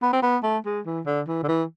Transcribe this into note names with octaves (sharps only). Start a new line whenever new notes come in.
B3
C4
B3
A3
G#3
E3
D3
E3
D3
E3